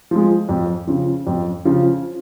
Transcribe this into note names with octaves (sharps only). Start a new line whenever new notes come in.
F3 G#3
F2
C#3 F3
F2
C#3 F3